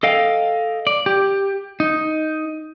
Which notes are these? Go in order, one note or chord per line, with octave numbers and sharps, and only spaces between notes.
A4 D#5 F5 G5
D5
G4
D#4